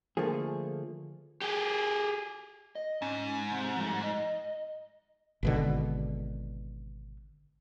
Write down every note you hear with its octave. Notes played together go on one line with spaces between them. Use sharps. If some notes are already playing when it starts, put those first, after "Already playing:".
D3 F3 A3 A#3 G#4
G4 G#4
D#5
G#2 C#4
C3 C4
F3 G3 A3
D#5
G#1 B2 D3